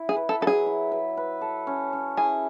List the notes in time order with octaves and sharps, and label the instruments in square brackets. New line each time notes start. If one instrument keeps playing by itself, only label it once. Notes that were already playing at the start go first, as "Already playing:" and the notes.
Already playing: [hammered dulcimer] E4
[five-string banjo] G#4
[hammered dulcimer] B4
[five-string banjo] A4
[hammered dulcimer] F#3 [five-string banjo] A4
[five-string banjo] G#4
[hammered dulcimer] E4
B4
B4
A4
C#4
C#4
[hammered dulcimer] E4 [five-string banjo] G#4